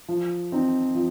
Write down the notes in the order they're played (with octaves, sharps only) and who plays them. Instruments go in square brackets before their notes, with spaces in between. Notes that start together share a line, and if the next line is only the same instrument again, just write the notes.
[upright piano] F3
C4 D#4
F3